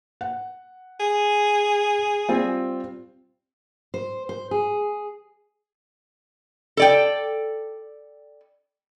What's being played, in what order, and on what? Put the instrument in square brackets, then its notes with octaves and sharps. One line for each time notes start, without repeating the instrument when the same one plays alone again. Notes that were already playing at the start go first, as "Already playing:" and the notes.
[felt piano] F#5
[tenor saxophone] G#4
[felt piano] G3 C4 F4
[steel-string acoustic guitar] C5
C5
G#4
[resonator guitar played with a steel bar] A4 D5 G5